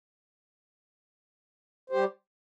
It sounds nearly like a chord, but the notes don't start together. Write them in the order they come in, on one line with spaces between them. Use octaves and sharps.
C5 G4 G3